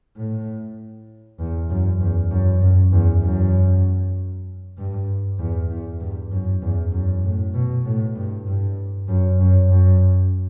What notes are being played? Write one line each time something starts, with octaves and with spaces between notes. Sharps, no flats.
A2
E2
F#2
E2
F#2
F#2
E2
F#2
G2
E2
E2
G2
F#2
E2
F#2
A2
B2
A2
G2
G2
F#2
F#2
F#2